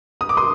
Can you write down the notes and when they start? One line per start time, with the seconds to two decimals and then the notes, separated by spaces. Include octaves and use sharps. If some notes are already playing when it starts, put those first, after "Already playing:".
0.21 D#6
0.29 D6
0.37 C6 D#6